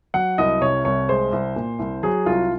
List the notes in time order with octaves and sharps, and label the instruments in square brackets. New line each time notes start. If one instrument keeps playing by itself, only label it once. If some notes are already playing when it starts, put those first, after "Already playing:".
[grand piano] F#3 F#5
C2 D#5
C3 C#5
C2 C#5
G#3 C5
C2
A#2
C2
F#3 G#4
C2 F4